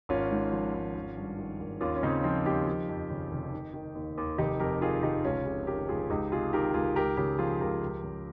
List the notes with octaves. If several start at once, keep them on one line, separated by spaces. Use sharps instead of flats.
G#1 C#4 F4
G#2
F3
G#1
G#1
G2
D#3
G#1
D#2 C#4 F4
C#4
C#3 C4 D#4
F3 C4 D#4
D#2 D#4 G4
F3
F2
C#3
F1
D#3
D#3
D#2
D#2
F1 D#4 G4
F2 G4 A#4
D#3 F4 G#4
F1 D#4 G4
C#2 C#4 F4
C3 F4 G#4
D#3 G4 A#4
C#2 F4 G#4
C#2 D#4 G4
C3 F4 G#4
D#3 G4 A#4
C#2 F4 G#4
C#2 G4 A#4
C#3 G4 A#4
F3 F4 G#4
C#2 G4 A#4
C#2
C#3